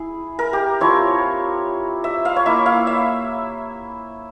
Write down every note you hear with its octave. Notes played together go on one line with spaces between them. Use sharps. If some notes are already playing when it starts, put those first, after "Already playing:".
Already playing: E4 G#4
A#4
G4
F3 C4 E4 C#5
E5
F5
C#5
A#3 E4 E5
F5
E5